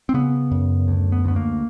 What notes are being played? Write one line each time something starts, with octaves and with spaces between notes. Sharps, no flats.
C4
C#3 B3
F#2
D2
B3
D2 B3
A#3